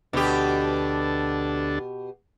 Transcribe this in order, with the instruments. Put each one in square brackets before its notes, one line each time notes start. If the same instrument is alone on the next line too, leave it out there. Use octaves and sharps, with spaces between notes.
[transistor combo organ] D2 D4 A4 [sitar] B2 G4